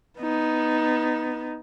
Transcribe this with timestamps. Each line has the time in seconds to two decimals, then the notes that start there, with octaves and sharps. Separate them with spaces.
0.18 B3 D#4